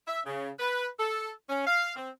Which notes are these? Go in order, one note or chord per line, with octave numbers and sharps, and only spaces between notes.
E5
C#3
B4
A4
C#4
F5
C4